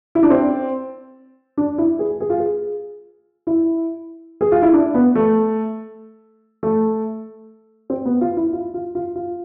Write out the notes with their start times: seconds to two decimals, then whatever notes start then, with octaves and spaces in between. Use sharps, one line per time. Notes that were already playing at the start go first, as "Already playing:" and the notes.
0.15 E4
0.23 D4
0.30 C4
1.57 D4
1.78 E4
1.99 G#4
2.20 G#4
2.30 F4
2.39 G#4
3.47 E4
4.41 G#4
4.52 F4
4.62 E4
4.73 D4
4.94 B3
5.15 A3
6.63 A3
7.90 C4
8.05 B3
8.21 F4
8.37 E4
8.53 F4
8.74 F4
8.95 F4
9.15 F4